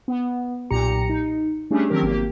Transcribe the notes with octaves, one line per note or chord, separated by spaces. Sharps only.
B3
B1 A#2 G4 A#5 C#7
D#4
G3 A3 C#4 D4 G4 G#4
D#3 F3 F#3 C4 G4 A#4
G#1 A#3 G4